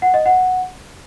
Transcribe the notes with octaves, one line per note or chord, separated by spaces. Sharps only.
F#5
D#5
F#5